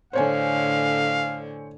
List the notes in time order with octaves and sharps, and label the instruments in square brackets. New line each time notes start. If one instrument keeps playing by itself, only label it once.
[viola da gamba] A2 D3 [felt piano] C5 C#5 G#5 [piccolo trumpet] F5